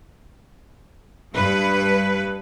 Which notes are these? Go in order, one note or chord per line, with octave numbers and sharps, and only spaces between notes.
G2 B4